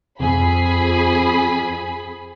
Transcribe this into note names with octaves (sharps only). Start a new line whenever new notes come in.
F2 G#4 B5